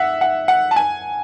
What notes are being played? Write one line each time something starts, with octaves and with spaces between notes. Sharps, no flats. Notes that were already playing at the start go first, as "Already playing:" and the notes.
Already playing: E5 F#5
F#5
F#5
A5
G#5